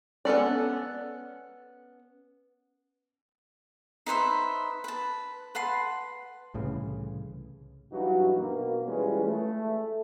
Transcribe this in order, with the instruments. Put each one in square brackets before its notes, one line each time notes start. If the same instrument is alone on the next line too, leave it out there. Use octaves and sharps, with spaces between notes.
[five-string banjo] B3 C#4 A4 D5
[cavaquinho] D#4 B4 C5 E5
B4 A5
B4 F#5 A5 C6
[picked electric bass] C2 A2 C#3 E3
[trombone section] G2 E3 F#3 D#4 F#4
B2 A#3
E3 G3 G#3 C#4 F4 B4
A3